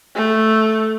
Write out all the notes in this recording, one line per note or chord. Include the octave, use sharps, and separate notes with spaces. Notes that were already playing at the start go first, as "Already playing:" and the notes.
A3